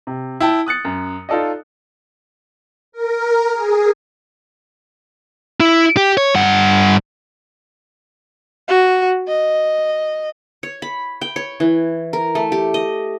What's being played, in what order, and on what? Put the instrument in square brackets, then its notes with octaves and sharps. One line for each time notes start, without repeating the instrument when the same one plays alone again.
[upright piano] C3
E4 G5 A5
D#6 F#6 A6 C#7
F#2
D#4 F4 A4 D5 D#5
[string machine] A#4
G#4
[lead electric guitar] E4
G4
C#5
G2 F#5
[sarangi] F#4
D#5
[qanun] C#5
B5
G5
C#5
E3
A#4
A3
G4
D#5